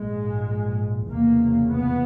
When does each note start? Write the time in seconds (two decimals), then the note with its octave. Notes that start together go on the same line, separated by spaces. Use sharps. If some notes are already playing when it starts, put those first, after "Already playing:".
Already playing: A#1 G#2 G#3
1.09 F1 E2 C#3 A#3
1.70 B3